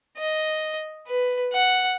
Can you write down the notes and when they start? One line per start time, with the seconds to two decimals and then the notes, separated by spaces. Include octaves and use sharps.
0.18 D#5
1.08 B4
1.53 F#5